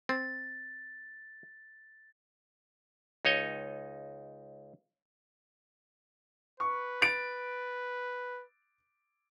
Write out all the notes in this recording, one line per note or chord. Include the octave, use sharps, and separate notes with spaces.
C4 A6
C#2 D#4 C#5 D#5
B4 C#6
A6 D7